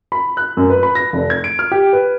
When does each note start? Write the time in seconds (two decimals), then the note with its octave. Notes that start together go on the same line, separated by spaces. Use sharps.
0.12 B5
0.37 F#6
0.57 F#2
0.70 B4
0.83 B5
0.95 A#6
1.13 F1
1.30 G#6
1.44 D7
1.59 F6
1.72 G4
1.93 B4